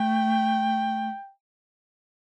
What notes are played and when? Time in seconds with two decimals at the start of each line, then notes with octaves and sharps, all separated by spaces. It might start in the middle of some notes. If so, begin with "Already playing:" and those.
Already playing: A3 G5